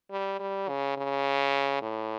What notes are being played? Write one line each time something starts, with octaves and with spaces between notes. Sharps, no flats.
G3
G3
C#3
C#3
A2